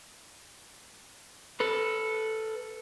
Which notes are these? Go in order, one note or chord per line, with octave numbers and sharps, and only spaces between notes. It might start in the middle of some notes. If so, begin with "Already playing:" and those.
A4 B4